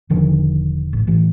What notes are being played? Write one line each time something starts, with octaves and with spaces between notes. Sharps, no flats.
E1 D3 D#3 F3
A1
A1 E3